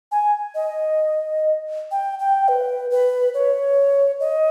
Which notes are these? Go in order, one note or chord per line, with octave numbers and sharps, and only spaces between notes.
G#5
D#5
G5
G5
B4
B4
C#5
D#5